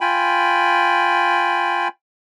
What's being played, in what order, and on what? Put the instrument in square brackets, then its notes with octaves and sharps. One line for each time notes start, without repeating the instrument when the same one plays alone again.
[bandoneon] F4 G5 G#5 B5